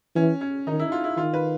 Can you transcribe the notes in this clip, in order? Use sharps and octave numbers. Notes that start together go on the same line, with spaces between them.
E3 C#4
C#4
D#3 D#4
E4
F4
E4
D#3 F4
B4